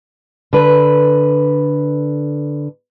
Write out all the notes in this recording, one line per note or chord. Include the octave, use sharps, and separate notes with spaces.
D3 B4